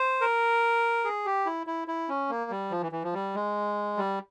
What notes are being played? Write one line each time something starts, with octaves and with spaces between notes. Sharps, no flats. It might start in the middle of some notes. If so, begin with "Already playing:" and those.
Already playing: C5
A#4
G#4
G4
E4
E4
E4
C#4
A#3
G3
F3
E3
E3
F3
G3
G#3
G3